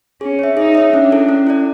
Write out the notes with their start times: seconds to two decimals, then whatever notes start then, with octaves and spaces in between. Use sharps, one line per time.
0.21 C#4 G#4
0.39 C#5 E5
0.57 D#4 G#4
0.75 C#5 E5
0.93 C#4 D4
1.11 E4 A4 D5
1.29 C#4
1.47 E4 A4 D5